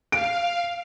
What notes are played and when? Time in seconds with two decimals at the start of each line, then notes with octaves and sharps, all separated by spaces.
0.12 F5 D7